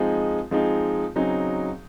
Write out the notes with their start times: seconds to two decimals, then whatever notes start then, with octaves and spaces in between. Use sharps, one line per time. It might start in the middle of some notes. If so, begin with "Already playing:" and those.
Already playing: F3 G#3 C4 D#4 G#4
0.51 F3 G#3 C4 D#4 G#4
1.15 C#3 F#3 C4 D#4 G#4